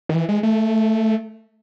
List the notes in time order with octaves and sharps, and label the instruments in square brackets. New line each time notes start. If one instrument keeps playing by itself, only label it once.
[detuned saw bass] D#3
E3
G#3
A3